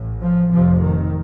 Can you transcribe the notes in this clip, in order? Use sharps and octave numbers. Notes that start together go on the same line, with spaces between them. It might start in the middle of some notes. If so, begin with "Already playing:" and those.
Already playing: A1 A2
F3
F1 F2 C3 F3
D#3